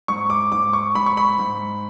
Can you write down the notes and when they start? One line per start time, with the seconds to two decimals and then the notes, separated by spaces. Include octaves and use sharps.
0.08 G#2 C#6
0.30 D6
0.52 G#2 D6
0.73 C#6
0.95 G#2 B5
1.06 C#6
1.17 B5
1.39 G#2